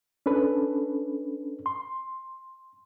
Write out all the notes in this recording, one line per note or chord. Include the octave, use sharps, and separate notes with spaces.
C#4 D4 A4 B4
C6